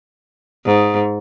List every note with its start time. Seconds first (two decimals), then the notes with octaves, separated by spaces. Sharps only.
0.66 G#2